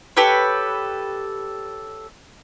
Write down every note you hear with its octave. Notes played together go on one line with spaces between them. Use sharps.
G4 A4 B4 C#5